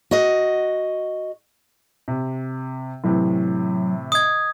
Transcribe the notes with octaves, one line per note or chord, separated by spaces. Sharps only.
F#4 D#5
C3
A2 C3 E3 F#3
D#5 D#6 G#6